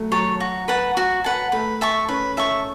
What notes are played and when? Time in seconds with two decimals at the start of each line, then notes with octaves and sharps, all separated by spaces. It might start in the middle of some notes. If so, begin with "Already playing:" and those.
Already playing: F#3 A3
0.11 F#3 C#5 A5
0.40 F#4
0.68 B4 F#5 A5
0.97 F#4
1.24 B4 F#5 A5
1.52 A3 B4
1.81 E5 A5 C#6
2.09 C#4 B4
2.37 C#4 E5 A5 C#6